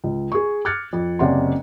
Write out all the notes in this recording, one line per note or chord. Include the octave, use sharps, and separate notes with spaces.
C#2
G#4 C#6
D6 F6 F#6 G#6 A6 C#7
F2
F#1 C3 C#4 D5 F#5 C6